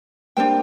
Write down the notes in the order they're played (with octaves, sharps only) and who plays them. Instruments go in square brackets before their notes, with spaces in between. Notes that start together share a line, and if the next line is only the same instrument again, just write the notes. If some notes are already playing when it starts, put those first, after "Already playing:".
[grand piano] G3 A#3 [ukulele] D4 A4 C5 G5